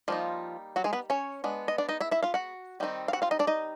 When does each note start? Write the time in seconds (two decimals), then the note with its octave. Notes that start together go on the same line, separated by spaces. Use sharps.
0.08 F3 G3 A#3 D#4 F4
0.76 F#3 F#4
0.84 G#3 G#4
0.93 B3 B4
1.10 C#4 C#5
1.44 G#3 B3 D4
1.68 D#5
1.78 D4 D5
1.89 D#4 D#5
2.00 E4 E5
2.11 E4 E5
2.23 F4 F5
2.34 F#4 F#5
2.80 D#3 G3 C4 D#4
3.08 F5
3.13 F#4 F#5
3.22 F4 F5
3.31 D#4 D#5
3.39 D4 D5
3.47 D#4 D#5